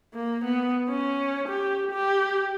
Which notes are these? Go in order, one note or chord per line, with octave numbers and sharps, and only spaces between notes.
A#3
B3
C#4
G4
G4